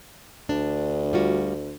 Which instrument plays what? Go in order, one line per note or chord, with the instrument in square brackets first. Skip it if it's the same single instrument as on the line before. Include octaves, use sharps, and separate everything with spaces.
[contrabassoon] D2 [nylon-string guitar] D4
[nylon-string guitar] G3 F4 F#4